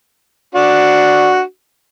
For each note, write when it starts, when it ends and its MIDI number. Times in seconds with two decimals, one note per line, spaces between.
0.55 1.41 62
0.55 1.41 66